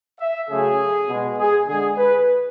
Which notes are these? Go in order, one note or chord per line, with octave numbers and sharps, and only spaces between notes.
E5
C#3 F#3 A3 G#4
B2 G#3
G#4
D3 G#3 G#4
B4